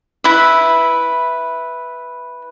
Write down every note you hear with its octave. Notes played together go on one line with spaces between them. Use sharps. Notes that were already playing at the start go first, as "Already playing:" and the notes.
E4 B4 E5